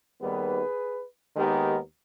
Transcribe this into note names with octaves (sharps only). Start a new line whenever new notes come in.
D#2 D#3 G3 B3 G#4 B4
D#2 D#3 G#3 B3 G4 A#4